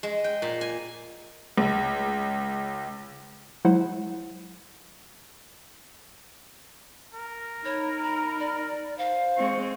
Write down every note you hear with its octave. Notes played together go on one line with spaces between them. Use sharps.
G#3
G5
A#2
G#5
C#2
F#3 G#3 E4 C5 F#5
A#4
D#4 C#5 B5
A#5
D5
C5 F5
G#3 C4 C#6